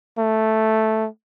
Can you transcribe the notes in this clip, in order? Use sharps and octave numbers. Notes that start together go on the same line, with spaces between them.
A3